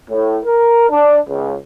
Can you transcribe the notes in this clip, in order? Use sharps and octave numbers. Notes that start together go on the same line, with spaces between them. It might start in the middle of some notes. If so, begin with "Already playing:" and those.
A2
A#4
D4
C#2